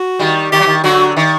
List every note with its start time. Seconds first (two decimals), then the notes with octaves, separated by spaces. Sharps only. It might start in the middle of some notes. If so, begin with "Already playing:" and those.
Already playing: F#4
0.19 D#3 G3
0.52 D#3 G4
0.60 F#3
0.67 D#3
0.84 D3 F#3 F#4
1.17 D#3